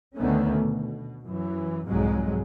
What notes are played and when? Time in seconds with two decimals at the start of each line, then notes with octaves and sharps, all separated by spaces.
0.17 D2 D3 D#3 A3 B3 C#4
0.58 B2
1.26 F#2 E3
1.86 C2 F2 G#2 F#3 G#3